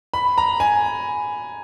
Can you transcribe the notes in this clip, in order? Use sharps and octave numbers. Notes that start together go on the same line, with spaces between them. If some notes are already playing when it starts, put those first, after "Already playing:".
B5
A#5
G#5